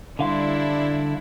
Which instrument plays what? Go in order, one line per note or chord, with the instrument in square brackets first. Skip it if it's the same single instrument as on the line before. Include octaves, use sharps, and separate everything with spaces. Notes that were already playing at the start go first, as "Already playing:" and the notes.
[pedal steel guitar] D3 F5 C6 [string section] G3 D4 E4